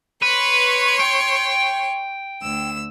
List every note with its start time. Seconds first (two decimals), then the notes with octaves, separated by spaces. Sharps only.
0.22 B4 C#5 C6 C#6
1.00 G5
2.41 D2 E6